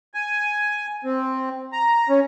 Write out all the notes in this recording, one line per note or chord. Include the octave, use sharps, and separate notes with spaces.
G#5
C4
A#5
C#4